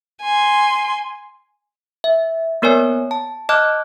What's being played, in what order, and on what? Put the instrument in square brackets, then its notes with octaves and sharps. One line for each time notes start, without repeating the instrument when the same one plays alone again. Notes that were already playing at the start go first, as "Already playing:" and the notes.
[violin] G#5 C6
[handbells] E5
A#3 B3 A#4 C#5 D5 G#5
A5
D#5 A5 D6 F6 F#6